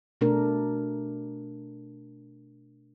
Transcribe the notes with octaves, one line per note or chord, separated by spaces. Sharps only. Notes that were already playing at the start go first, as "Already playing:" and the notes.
B2 A3 D4 A#4